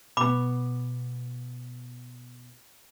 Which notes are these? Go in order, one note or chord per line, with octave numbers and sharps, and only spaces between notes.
B2 B3 B5 D6